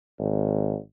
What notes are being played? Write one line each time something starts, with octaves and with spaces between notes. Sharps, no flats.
G#1